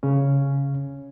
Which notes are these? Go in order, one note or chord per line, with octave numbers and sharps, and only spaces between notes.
C#3 C#4